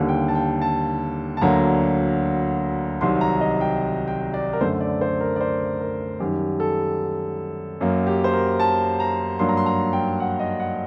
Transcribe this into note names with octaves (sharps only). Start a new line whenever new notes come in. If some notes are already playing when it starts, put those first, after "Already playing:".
Already playing: D#2 D3 G3 A#3
G5
A5
G5
A5
A5
D2 D3 F#3 A#3 A#5
C2 C3 D#3 F#3 C6
A#5
D#5
G5
G5
D5
A#4
F#2 D3 A3 C5
D5
C5
A#4
D5
C5
A#4
F#2 D#3 G3 G4
A4
F#2 F#3 A#3
G4
C5
A#4
A5
A#5
G2 F#3 A#3 C6
A#5
C6
A#5
G5
F#5
D#5
F#5